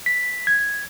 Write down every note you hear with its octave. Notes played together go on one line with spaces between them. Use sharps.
B6
G#6